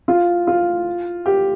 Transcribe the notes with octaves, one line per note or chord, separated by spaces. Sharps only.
F4
F4
G4